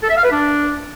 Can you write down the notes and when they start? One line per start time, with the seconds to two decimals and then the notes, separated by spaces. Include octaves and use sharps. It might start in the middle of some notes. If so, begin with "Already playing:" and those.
0.03 A4
0.10 E5
0.17 F5
0.24 B4
0.31 D4